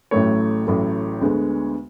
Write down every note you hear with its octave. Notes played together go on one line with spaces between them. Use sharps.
A1 A2 F#3 A3 C#5
A1 A2 F#3 A3
D2 D3 G#3 B3